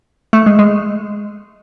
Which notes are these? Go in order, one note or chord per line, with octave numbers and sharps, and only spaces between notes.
A3
G#3
G#3